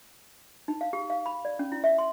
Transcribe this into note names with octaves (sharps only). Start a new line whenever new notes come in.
D#4
F5
G4
F5
B5
D5
C#4
E4
E5
C6